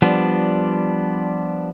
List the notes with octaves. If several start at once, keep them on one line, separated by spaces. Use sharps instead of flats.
F3 G3 B3 D4